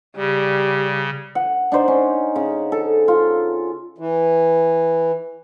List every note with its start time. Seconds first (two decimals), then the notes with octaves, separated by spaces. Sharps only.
0.16 C#3 G3
1.35 F#5
1.72 D4 D#4 C5 D5
1.88 C#4
2.36 C#3
2.72 A4
3.08 F4
3.98 E3